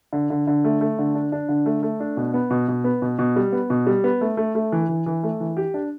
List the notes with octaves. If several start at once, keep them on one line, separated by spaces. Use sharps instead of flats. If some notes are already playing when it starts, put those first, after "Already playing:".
D3
D3
D3
A3
A3
D3
D4
D4
D3
A3
A3
D4
B2
B3
B2
B2
B3
B2
B2
G3
B3
B2
G3
B3
A3
A3
A3
E3
E3
E3
A3
E3
G4
D4